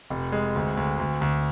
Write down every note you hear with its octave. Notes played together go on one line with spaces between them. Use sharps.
F1
G#3
D2
D2
D2
D2